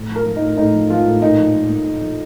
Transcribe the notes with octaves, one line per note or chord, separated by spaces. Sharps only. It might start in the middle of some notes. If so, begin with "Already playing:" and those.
Already playing: A2
F3
A#4
F3
D#4
A2
A2 D#4
F3
F3 F4
A2
A#2 D#4
F3
F3
A#2
A#2
F3